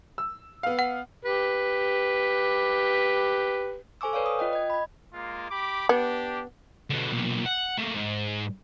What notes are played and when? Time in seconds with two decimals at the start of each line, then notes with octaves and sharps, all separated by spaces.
0.18 E6
0.63 B3 F5
0.79 F#5
1.25 G4 B4
4.01 A4 C5 G#5 C#6 D6 E6
4.13 B4 C#5 D5 F5
4.26 D#6
4.39 F4 D#5 G5
4.53 D#5 G#6
4.70 B5 G#6
5.14 G#3 A#3 F4
5.50 G4 B5 D6
5.89 B3 D4 G4
6.90 B2 D3
7.12 B1 A#2
7.46 F#5
7.78 A3 A#3
7.94 G#2